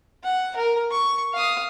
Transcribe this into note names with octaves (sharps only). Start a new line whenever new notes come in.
F#5
A#4
C#6
F5 D#6